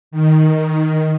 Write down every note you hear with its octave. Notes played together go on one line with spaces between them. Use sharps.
D#3